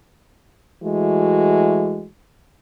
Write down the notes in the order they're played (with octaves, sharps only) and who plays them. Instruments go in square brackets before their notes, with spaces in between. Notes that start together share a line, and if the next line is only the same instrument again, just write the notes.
[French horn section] E3 G#3 A3 F#4